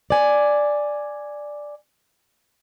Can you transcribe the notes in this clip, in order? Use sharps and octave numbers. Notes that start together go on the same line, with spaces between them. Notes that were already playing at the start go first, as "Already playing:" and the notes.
D5 G#5